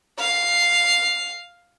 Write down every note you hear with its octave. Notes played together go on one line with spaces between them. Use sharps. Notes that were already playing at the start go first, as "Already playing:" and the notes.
F5 C7